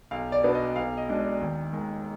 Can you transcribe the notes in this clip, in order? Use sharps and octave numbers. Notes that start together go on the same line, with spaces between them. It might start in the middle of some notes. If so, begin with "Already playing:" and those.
B1 F5
D5
B2 B3 D4
D#5
B1 F5
D#5
B2 G#3 D4
D5
D#2
D#3 G#3